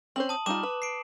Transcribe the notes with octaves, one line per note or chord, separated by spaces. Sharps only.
C4 C#4 C5 F#7
A5 D#6
G3 D#4 F4 D6 E7
B4
C7 D7